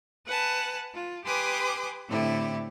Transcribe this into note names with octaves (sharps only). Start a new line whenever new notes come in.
B4 F#5 G#5 A5
F4
G4 B4 G#5 C6 D6 D#6
A2 D3 C4 E4 G4